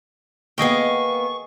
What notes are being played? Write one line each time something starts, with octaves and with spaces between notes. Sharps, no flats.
A#3 B3 G#4 D#5 G5 C#6